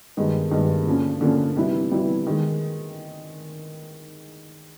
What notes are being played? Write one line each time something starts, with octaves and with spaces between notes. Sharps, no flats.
G2 D#3 G#3 B3
G2 D#3 G#3 B3
D3 F3 A#3 C#4
D3 F3 A#3 C#4
C3 E3 G3 B3 E4
C3 E3 G3 B3 E4
D#3 G#3